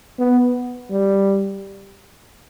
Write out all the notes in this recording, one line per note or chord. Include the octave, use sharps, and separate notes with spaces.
B3
G3